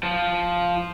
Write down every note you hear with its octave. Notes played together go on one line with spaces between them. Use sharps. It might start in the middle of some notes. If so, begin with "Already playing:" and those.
F3